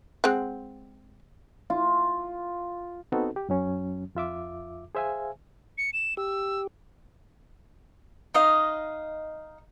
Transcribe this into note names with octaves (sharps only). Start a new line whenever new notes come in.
G#3 C4 F#5
F4
B3 C4 D#4 F#4 A4
G4
F#2 F#3 C#4
F2 F4 E5 D6
G#4 C5 E5 F5 G#5
C#7
E7
G4 E6
D#4 D#5 F5